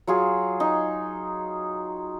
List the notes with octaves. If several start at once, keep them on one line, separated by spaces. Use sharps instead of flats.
F#3 F4 G#4
D#4